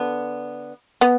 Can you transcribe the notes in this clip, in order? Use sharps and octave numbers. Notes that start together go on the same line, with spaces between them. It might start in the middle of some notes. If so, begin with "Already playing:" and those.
Already playing: D3 B3
B3